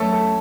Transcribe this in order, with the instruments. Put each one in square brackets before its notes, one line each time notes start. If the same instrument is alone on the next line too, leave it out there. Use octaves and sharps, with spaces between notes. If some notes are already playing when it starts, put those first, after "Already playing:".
Already playing: [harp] A3 [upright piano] A4 C#5
[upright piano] A4